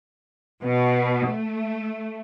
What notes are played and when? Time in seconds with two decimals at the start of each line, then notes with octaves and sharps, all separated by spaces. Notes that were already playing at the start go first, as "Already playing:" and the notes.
0.62 B2
1.28 A3